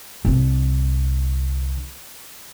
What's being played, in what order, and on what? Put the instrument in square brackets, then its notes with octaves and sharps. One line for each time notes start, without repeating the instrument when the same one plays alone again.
[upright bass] C2 D3